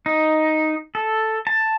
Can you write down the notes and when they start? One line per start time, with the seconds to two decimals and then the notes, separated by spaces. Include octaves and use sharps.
0.06 D#4
0.95 A4
1.47 A5